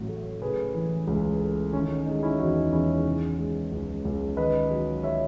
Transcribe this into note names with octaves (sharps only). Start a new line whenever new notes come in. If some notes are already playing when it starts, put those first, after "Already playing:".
Already playing: A1 A2 F#3
A3
C#3 G#4 B4
E3
C#2
A3
D#3 C#4 E4
C#4
G#3 D#4
C#4 E4
E2 D#4 F#4
E2 C#4 E4
C#3
G#3
C#2
C#2
D#3 B4 D#5
F#3
C#5 E5